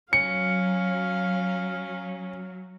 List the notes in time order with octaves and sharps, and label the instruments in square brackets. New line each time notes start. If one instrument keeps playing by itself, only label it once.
[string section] F#3 [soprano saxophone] C#4 [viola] F5 [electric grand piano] C#7